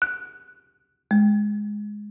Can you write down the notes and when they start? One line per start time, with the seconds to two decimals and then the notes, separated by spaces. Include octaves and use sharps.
0.02 F#6
1.11 G#3